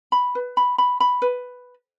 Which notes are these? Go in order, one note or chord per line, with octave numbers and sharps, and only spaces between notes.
B5
B4
B5
B5
B5
B4